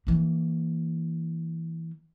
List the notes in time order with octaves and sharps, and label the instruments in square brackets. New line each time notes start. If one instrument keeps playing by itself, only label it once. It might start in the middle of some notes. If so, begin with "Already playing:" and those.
[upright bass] E3 A#3